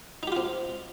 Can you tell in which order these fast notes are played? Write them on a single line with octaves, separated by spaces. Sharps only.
D#4 G4 F4 C4